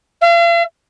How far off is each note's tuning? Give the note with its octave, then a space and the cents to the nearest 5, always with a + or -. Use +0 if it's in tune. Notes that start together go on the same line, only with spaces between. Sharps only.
F5 -45